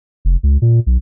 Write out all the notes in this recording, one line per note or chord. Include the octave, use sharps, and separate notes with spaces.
F1
C#2
A#2
B1